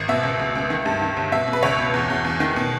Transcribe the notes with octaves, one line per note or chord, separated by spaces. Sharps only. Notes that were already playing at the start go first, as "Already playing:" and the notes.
Already playing: G#1
B2 E5
C#2
C#2
C#2
D#3
G2
D#3
G1
B2 E5
B2
B4
C#2 C#5
B2
E2
E2
E2
D#3
B2